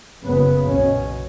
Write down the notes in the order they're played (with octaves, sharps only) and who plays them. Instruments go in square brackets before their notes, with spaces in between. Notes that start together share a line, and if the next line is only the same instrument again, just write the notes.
[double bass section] F#1 F#2 C#3 B3
B1 B2 C#4